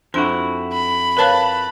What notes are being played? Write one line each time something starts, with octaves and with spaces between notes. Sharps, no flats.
F2 D4 E4 F#4 C5 C6
B5
A#4 B4 C#5 F5 A5 F#6